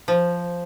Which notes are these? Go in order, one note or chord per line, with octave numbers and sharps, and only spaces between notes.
F3